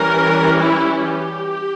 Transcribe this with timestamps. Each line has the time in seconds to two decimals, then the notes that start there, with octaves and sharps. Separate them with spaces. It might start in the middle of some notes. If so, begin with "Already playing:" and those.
Already playing: E3 G3 C#4 A#4
0.60 E4
1.06 G4